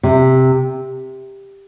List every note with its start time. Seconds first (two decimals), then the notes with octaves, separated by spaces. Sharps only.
0.03 C3